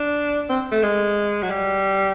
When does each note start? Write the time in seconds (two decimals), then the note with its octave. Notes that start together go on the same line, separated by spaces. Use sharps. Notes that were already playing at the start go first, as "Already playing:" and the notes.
Already playing: D4
0.49 C4
0.72 A3
0.83 G#3
1.43 F#3
1.51 G3